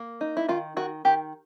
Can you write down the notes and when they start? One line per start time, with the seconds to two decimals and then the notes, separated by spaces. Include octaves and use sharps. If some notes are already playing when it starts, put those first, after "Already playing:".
Already playing: A#3
0.21 D#4
0.37 E4
0.49 D#3 F4
0.77 D#3 F#4
1.05 D#3 G4